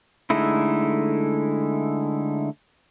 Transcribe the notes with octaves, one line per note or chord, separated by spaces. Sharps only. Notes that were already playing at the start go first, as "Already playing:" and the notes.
D3 G#3 A3 D#4 E4